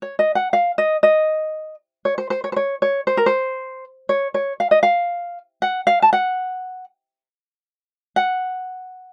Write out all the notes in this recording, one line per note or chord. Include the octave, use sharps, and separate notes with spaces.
C#5
D#5
F#5
F5
D#5
D#5
C#5
C5
C5
C#5
C5
C#5
C#5
C5
A#4
C5
C#5
C#5
F5
D#5
F5
F#5
F5
A5
F#5
F#5